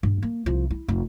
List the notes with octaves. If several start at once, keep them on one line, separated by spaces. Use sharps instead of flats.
G2
A#3
C2 F3
E4
F1